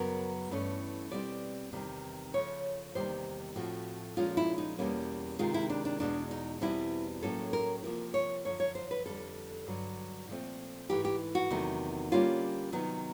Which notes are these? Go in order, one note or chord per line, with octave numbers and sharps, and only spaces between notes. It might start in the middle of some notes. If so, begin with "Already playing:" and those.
Already playing: F#2 C#3 F#3 B3 A#4
G2 E3 A3 C#4
B2 G3 C4 D5
E2 C3 D#3 G3 C4
C#3 F3 A3 C#5
E2 C3 D#3 G3 A#3 C5
A2 F3 A3 C4 F#4
A#2 F3 G#3 C#4 F4
E4
D#4
E2 B2 G3 A#3 C#4
C3 D#3 G#3 F4
E4
D4
D4
E2 B2 G#3 D4
D#4
E2 B2 G3 C4 E4
A2 F#3 A#3 C#4 A4
A#4
C3 F3 A#3 A#4
C#5
F#2 D3 F3 C#5
C#5
C5
B4
F2 D3 G3 A4
G2 D3 F#3
A#2 F3 A3 C4
G#2 E3 A3 G4
G4
F#4
E2 C3 D#3 F#3 A3
D3 G3 A#3 C#4 F4
C3 D#3 F#3 B3